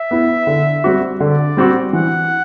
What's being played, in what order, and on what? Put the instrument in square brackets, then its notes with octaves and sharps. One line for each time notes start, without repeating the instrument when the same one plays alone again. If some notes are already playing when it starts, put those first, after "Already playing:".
Already playing: [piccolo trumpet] E5
[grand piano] B3 E4
D3
G3 C4 F#4
[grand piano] D3 [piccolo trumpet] D5
[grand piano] G3 C4 F#4
[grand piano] E3 [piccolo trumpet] F#5